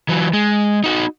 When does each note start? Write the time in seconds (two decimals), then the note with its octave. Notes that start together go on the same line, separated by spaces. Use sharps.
0.09 E3 F#3
0.33 G#3
0.84 D#4 F#4